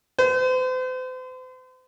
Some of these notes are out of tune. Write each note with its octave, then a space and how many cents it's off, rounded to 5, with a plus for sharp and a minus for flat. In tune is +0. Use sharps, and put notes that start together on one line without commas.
C5 -40